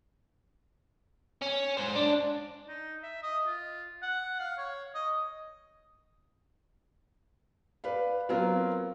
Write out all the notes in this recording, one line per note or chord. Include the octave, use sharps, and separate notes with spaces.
C#4
G#2 C5
D4
D#4
E5
D#5
F4
F#5
F5
C#5
D#5
B4 D5 F5
F#3 B3 C4 F4 A#4